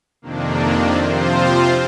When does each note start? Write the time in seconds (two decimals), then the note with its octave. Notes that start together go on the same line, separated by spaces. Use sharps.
0.22 F2 C3 D#3 A#3 D4
0.96 C3 F3 C4 F4 C5